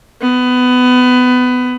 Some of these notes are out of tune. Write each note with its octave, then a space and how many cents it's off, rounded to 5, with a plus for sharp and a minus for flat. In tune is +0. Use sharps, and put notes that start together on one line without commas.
B3 +20